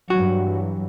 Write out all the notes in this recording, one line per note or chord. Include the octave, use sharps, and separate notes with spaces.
G2 E3 F#3 F#4